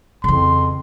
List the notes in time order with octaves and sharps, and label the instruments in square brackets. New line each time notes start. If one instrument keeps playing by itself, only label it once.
[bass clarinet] F2 [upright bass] C#3 E3 [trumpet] C6